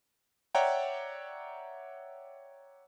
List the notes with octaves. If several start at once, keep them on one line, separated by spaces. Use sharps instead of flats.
C#5 D5 E5 F#5 G5 A#5